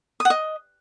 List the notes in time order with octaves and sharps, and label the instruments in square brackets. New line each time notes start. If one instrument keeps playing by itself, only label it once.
[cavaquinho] D#6
F#5
D#5